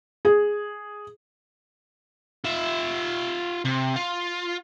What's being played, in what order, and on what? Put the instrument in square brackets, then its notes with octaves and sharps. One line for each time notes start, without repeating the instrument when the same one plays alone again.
[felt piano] G#4
[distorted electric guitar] F4 E5
C3
F4